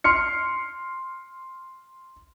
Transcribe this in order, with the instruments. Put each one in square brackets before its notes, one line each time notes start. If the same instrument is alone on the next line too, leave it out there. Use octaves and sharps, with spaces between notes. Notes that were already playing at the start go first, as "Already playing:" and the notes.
[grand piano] C6 F6 C#7